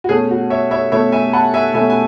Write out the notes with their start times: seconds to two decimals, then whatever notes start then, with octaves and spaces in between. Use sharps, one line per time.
0.04 F#4
0.09 B2 A3 C#4 G#4
0.31 F#4
0.50 C#5 E5
0.71 C#5 E5
0.92 B2 A3 C#4 C#5 E5
1.12 E5 G#5
1.33 F#5 A5
1.54 E5 G#5
1.74 B2 A3 C#4 E5 G#5
1.90 G#5